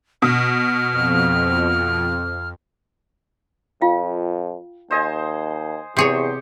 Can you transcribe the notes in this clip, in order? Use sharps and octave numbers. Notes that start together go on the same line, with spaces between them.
B2 F6
F2
F2 F4 F5 G5
D#2 C5 D#5 G#5
E2 C3 G4 G#4 C5 C#5 C#6